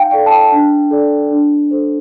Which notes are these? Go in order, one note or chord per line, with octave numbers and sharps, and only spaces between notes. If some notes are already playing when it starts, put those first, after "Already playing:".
Already playing: D#4 F5 G5
A4 D5 G5
A5
G5
D4
A4 D5
D4
A4 C5